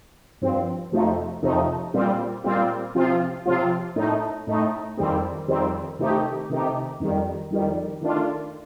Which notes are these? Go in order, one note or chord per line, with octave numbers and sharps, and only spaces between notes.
G2 F3 C4
F2 C3 F3 A3 D#4
F2 C3 F3 A3 D#4
A#2 G3 C4 F4
A#2 G3 C4 F4
C3 F3 C4 F4
C3 F3 C4 F4
A2 A3 D#4
A2 A3 D#4
F2 D#3 G3 C4
F2 D#3 G3 C4
C3 D#3 A3 D#4 G4
C3 D#3 A3 D#4 G4
F2 D#3 G3
F2 D#3 G3
D#3 A3 D4 F4